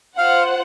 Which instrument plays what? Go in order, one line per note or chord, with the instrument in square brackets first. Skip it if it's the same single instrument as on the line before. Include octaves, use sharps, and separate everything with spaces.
[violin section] F4 C5 F#5 [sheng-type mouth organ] F5